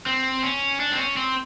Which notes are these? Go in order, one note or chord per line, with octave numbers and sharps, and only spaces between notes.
C4
C#4
D4
C4
C#4
C4